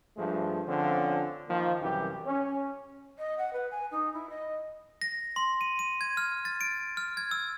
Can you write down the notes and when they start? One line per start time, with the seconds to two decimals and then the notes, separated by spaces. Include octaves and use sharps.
0.17 G2 F3 G#3 A3
0.66 D3 F3 C4 C#4
1.48 D#3 F3 A#3
1.81 C2 F#2 E3 G4
2.26 C#4
3.16 D#5
3.38 F#5
3.52 B4
3.71 G#5
3.91 D#4
4.13 E4
4.29 D#5
5.02 A#6
5.36 C6
5.61 D#7
5.79 D#7
6.01 G#6
6.17 F6
6.45 A6
6.61 D7
6.97 F6
7.17 G#6
7.31 E6